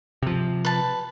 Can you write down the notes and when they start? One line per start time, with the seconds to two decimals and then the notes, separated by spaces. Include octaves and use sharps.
0.22 C3 F3
0.65 B4 A5